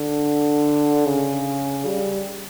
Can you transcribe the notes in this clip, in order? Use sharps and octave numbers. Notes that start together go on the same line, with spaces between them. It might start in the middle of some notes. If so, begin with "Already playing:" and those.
Already playing: D3
C#3
G3